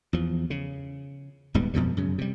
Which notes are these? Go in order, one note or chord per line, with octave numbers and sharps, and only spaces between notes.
E2 F3
C#3
D#1 G#2 G3 B3
F2 B2 F3 G3
F#2 C#3
C3 G3